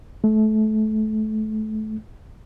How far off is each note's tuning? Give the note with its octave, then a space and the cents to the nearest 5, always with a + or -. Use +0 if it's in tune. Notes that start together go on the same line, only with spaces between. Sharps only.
A3 -25